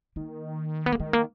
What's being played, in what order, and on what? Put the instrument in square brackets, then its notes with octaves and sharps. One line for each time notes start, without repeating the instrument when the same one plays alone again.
[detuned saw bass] D#3 [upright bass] A#3
[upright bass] B3
A#3
[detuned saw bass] D#3 [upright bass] G#3
[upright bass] A#3